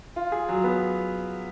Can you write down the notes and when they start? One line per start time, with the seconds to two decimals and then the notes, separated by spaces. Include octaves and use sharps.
0.16 F4
0.32 G#4
0.49 F#3
0.64 B3